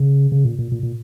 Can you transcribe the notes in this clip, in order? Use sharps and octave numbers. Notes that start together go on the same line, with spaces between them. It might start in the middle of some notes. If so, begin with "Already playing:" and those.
Already playing: C#3
C#3
A#2
A#2
A#2
A#2